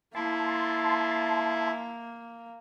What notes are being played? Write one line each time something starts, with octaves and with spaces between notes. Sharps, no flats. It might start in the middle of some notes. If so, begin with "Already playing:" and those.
A#3 E4 A5 C6